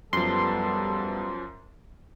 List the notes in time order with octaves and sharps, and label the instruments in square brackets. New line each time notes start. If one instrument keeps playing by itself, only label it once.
[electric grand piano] F#2 F3 [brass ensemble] G3 B3 A4 [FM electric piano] C6